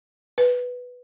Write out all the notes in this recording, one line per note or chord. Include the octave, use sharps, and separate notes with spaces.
B4